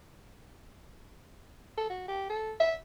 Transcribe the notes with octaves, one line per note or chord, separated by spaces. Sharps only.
A4
F#4
G4
A4
E5